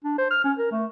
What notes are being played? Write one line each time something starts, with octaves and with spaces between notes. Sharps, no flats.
D4
C5
F6
C#4
A#4
A3